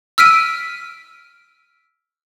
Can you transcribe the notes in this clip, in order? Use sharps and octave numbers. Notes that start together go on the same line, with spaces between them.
E6 F6 B6 D7 D#7